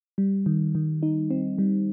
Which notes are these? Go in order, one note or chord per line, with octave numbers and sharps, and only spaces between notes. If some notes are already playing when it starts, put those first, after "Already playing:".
G3
D#3
D#3
D#4
C4
G3